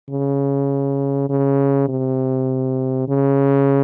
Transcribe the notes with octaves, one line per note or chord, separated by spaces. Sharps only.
C#3
C#3
C3
C#3